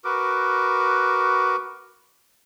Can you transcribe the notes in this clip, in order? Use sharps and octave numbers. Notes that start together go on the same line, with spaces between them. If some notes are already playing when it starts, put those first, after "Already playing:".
F#4 A#4 B4 D6